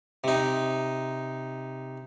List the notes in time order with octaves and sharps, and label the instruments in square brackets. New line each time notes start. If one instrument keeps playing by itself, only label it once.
[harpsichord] C3 D#4